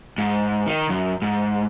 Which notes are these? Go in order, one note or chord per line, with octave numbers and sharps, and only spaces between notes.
G#2
D#3
F#2
G#2